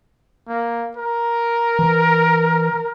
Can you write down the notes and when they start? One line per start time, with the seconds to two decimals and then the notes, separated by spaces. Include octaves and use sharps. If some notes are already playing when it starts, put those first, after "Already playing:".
0.48 A#3
0.97 A#4
1.79 E3